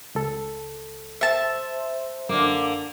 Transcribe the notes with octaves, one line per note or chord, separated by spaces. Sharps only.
C#2 A4
C5 E5 A5
F#2 D3 A#3 D6